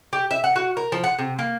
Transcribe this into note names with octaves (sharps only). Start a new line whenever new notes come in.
G4
E5
F#5
F#4
A#4
F3
F#5
C3
A#3